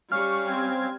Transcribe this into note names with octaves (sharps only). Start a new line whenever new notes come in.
G3 C#4 F5 C#6 F6
C4 G#6